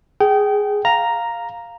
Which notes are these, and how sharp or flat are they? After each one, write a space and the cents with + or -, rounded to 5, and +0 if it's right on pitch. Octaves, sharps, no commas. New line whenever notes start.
G#4 +0 G5 -25
F5 +0 A#5 +0